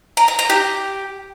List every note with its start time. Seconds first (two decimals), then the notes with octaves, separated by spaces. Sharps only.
0.17 A#5
0.28 A#5
0.39 A#5
0.50 G4